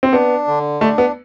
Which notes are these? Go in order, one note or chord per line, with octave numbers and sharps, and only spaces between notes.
C4
B3 D4
D3
A3 D4
B3